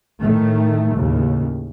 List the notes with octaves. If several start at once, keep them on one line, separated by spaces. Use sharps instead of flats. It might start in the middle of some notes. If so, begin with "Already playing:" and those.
A2 D#3 A3
D#2 A2 C#3